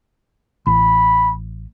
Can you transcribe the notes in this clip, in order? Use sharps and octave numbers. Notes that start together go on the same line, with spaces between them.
A1 B5